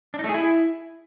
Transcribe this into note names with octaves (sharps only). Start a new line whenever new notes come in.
D4
D#4
A3
G#4
E4